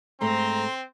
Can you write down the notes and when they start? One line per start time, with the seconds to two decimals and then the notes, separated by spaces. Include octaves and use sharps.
0.21 G#2 A3 C4 A#5 C6